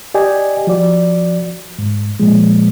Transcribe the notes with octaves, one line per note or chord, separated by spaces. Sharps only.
G4 D5 D#5 G5 G#5
F3 F#4 D5
G#2
A#2 F3 G#3